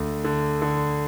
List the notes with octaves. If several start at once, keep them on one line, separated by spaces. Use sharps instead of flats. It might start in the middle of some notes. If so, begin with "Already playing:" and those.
Already playing: D2 D3
D3
D3